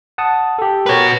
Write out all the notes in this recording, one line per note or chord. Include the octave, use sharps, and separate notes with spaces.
F#5 A5 D#6
G4 A4
F#4 A#4 B4 C#5